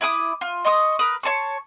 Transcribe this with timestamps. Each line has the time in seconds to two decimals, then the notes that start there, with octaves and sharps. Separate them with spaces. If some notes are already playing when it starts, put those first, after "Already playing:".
0.01 E4 B5 D6 D#6
0.41 F4
0.65 D#5 C6 C#6 D#6
0.99 A#4 B4 B5 D#6
1.23 C#5 A5 C6 C#6